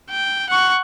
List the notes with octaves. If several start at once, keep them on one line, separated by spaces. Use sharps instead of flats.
G5
F#5 C#6